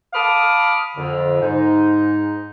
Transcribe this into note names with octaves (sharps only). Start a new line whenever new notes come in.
F5 A5 B5 D6 D#6 F6
F2 D3
G#2 D#4